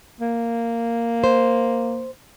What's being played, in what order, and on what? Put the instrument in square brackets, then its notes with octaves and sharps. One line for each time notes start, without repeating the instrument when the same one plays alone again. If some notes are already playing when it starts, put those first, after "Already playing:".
[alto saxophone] A#3
[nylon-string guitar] C5